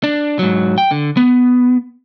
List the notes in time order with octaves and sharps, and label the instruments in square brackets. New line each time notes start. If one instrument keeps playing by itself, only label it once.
[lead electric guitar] D4
G#2 F#3
G5
D3
B3